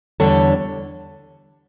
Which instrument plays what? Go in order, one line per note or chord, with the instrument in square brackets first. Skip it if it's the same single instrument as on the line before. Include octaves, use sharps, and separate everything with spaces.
[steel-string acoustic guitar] E2 D3 G3 D4 A4 C#5